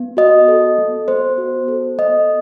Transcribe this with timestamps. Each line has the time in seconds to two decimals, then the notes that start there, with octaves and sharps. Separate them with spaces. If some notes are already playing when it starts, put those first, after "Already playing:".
Already playing: B3
0.17 F#4 D#5
0.48 A4
0.78 B3
1.08 B3 C5
1.38 F#4
1.68 A4
1.99 B3 D#5